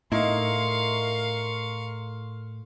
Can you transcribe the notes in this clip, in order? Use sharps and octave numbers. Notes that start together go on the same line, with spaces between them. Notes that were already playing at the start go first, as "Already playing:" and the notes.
A2 D#4 E4 A#4 F5 C6 C#6